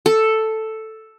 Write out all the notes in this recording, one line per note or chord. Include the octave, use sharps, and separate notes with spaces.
A4